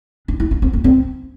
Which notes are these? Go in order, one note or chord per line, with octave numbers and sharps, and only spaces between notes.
D4
E4
D4
C4
A#3
C4